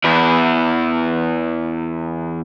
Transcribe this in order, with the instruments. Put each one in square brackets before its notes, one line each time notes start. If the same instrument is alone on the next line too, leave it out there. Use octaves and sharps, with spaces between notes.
[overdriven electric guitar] E2 E4